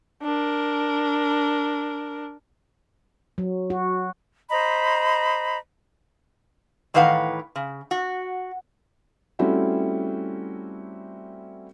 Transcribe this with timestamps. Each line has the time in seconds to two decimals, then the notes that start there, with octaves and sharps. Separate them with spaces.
0.23 D4 A#4
3.38 F#3
3.70 F#4
4.50 C5 D#5 A#5 B5
6.94 A2 D#3 E3 B4 F5 F#5
7.56 C#3
7.91 F#4
9.39 G3 A3 C4 C#4 E4 F#4